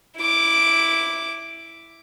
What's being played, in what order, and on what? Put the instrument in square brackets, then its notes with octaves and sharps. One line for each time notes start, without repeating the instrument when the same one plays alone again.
[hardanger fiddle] E4 D6